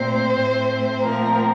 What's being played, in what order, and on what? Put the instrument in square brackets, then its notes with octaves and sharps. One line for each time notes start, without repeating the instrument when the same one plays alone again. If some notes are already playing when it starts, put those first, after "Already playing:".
Already playing: [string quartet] A#2 A3 C4 C5
A2 A3 C4
A#2 F3 A3 C4 A#4